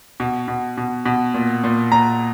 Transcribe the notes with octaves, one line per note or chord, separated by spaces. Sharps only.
B2
B2
B2
B2
A#2
A#2
A#2 A#5